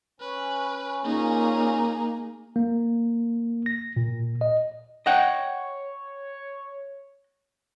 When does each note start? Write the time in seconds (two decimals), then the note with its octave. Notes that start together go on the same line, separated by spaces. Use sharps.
0.20 C#4 B4
1.04 A#2 A#3 C#4 D#4 G#4
2.56 A#3
3.66 A#6
3.96 A#2
4.41 D#5
5.06 C#5 D#5 F#5 G5